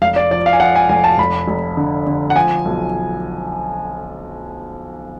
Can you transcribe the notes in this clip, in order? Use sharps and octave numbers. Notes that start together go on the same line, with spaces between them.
F1 F5
D5
F3 D5
F5
G#5
F3 F#5
G#5
F1 G#5
A5
F1 B5
F1
D3
D3
F#5
F3 G#5
B1